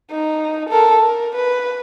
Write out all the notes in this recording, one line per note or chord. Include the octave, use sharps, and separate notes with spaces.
D#4
A4 A#4
A#4
B4